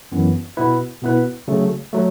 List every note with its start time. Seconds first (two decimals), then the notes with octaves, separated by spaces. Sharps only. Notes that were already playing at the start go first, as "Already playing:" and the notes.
0.12 F#2 E3 B3
0.57 B2 B3 E4 B4
1.02 B2 B3 E4 B4
1.48 C#3 F#3 A3
1.93 F#3 A3